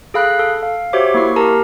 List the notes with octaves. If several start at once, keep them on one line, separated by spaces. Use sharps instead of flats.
G#4 A4 F5 B5 F#6
A4
F5
F#4 G4 C5 C#5 E5 D6
A#3 E4 C#6 C7
G4 A#4 A5 A#5